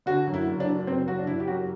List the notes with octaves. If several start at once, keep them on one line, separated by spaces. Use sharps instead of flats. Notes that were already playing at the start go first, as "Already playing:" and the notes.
D3 F#4
F#2
E4
F#1
D4
F#3
F#1 C4
F#3 F#4
D4
F#1 E4
G4
F#2 F#4